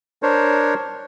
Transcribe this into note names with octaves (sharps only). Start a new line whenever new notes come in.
D4 A#4 C5 C#5